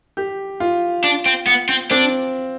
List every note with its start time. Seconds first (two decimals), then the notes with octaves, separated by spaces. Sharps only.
0.17 G4
0.60 F4
1.04 D4
1.26 C4
1.47 B3
1.69 C4
1.90 C4 D4